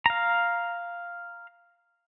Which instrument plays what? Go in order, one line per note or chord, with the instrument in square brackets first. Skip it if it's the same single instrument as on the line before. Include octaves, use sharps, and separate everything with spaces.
[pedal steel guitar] F5 A#5